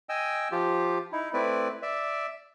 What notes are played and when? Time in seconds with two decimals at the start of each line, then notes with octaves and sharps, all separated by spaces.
0.09 D#5 G5 G#5 E6
0.52 F3 F4 G4
1.12 D#4 E4
1.34 A3 C4 E4 B4 D5
1.82 D5 E5